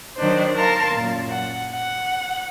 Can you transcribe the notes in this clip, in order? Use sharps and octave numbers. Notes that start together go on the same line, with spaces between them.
D#3 F#3 D4 D#4 C5
A#4 F5 A5 A#5 C6
F#2 A#2
F#5
F#5